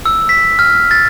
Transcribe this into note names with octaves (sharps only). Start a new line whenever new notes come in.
E6
B6
F6
A6